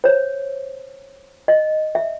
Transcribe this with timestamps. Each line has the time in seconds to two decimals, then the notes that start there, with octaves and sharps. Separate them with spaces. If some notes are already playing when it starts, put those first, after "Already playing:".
0.04 C5 C#5
1.48 D#5
1.95 E5